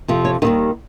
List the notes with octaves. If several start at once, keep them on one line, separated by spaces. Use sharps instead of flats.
F2 C3 F3
C#5
D#2 D#3 G3 D#4